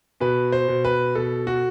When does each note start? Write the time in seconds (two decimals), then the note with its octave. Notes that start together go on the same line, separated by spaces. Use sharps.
0.20 B2 B4
0.52 C5
0.68 B2
0.85 B4
1.15 B2 A4
1.47 F#4